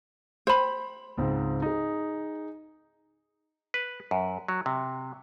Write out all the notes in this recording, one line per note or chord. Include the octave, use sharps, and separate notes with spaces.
C5 B5
C#2 G#2 C4
D#4 G#4
B4
F#2
F#3
C3